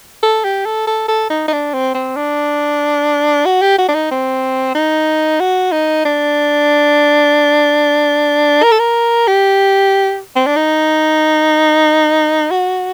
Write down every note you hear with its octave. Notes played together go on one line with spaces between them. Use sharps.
A4
G4
A4
A4
A4
D#4
D#4
D4
C4
C4
D4
F#4
G4
F#4
D4
D#4
C4
D#4
F#4
D#4
D4
A#4
A4
A#4
G4
C4
D4
D#4
F#4